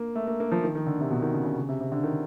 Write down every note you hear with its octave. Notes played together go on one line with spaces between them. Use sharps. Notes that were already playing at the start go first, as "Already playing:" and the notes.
Already playing: A#3
A3
A#3
A#3
F3
D#3
D#3
D3
C3
B2
D#3
C#3
C#3
C#3
C3
C3
D3
D#3